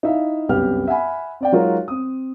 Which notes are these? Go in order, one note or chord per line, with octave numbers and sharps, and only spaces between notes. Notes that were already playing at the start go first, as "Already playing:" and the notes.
D#4 E4 E5 F5
C2 F#2 B3 G4 F6
E5 F#5 G#5 B5
C4 D5 G5
F#3 G#3 D#4 F4 F#4 A#4
C4 D#6